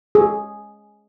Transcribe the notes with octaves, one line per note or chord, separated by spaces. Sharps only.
G#4